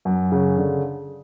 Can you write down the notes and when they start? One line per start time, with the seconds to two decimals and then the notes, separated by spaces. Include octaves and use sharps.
0.05 F#2
0.32 C#3
0.58 D3